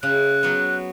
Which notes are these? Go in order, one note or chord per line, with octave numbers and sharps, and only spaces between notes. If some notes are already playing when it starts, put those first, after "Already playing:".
C#3 F#6
F#3 B3